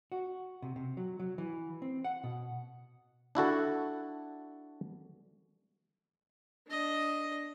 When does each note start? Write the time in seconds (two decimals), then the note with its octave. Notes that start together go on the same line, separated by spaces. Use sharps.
0.12 F#4
0.62 C3
0.76 C3
0.97 F#3
1.19 F#3
1.38 E3
1.82 C4
2.04 F#5
2.24 B2
3.35 D4 E4 F#4 A4
6.68 D4 D#5